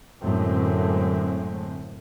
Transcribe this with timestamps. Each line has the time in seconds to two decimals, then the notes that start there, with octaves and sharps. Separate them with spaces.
0.22 F#2 A2 D3 G#3 A3 C4